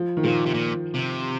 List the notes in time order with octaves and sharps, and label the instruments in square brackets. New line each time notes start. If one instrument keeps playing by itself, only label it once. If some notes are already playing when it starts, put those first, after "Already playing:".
Already playing: [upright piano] F3
D#3
[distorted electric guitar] A#2 [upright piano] F3
[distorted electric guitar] C3
A#2
C3